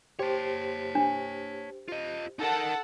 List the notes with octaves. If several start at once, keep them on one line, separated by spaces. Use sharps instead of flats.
G4 C5 C#5 A5
D4
F4 D#5
D#4 A4 A#4 F#5